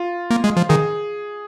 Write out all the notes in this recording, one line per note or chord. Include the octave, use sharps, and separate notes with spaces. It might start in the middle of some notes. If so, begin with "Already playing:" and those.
Already playing: F4
A#3
G#3
F3
D#3 G#4